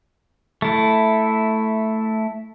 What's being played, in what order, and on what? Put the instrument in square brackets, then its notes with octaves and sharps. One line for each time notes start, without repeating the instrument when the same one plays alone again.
[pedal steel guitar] A3 E4